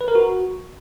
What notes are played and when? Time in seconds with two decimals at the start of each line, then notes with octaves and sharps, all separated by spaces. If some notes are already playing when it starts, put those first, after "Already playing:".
0.01 B4
0.08 A#4
0.15 F#4